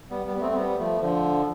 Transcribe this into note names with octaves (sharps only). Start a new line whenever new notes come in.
G3 B3
G3 B3
B3
A3 C4
C4
G3 B3
F3 A3
D3 F3